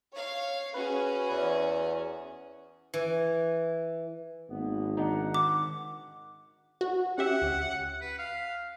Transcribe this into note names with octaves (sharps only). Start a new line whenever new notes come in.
C#5 F5
C#4 F#4 G#4 B4
E2
E3
G#1 A#3 B3
D#3 D4 D#4 F#5
D6
F#4
C#4 G4 E5 F#5
D2
B4
F5